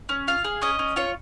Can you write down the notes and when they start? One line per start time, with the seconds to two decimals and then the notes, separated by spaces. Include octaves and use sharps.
0.09 C#4
0.27 F4 F5
0.44 G#4
0.62 C#4 D#5
0.79 C#4
0.96 F4 C#5